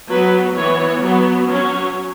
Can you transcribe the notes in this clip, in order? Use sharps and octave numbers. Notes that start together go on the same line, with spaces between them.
F#3 B3 B4
E3 B3 C#5
F#3 B3
F#3 C#4 C#5